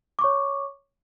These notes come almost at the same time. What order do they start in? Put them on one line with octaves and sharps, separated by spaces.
D6 C#6 C#5